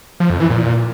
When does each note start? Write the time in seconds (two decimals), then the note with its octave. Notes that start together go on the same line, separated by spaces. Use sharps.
0.20 F3
0.30 F2
0.40 E3
0.50 A#2